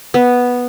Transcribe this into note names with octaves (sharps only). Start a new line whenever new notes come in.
B3